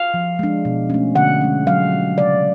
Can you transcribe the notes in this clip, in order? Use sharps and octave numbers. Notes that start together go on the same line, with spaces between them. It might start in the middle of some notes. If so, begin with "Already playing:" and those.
Already playing: F5
F3
G#3 D4
B2
A3 C#4
D3 F#5
G#3 C#4
F#3 F5
C#4
C#3 D5